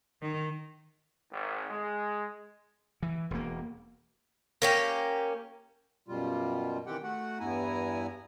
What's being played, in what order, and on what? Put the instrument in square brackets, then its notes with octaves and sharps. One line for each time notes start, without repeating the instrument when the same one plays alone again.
[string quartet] D#3
[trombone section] G#1
G#3
[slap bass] E3
E1 A#3
[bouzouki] A#3 C#4 G4
[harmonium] F#2 B2 G3 F4
D#3 E3 C4 G4 F#5 G5
A3 F#4 F#5
E2 G2 B3 E4 G#5 A#5